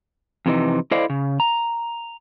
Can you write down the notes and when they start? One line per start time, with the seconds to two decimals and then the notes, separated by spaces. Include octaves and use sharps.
0.46 F2 C3 E3 D#4
0.91 E4 A4 C5 D5 D#5 F5
1.10 C#3
1.40 A#5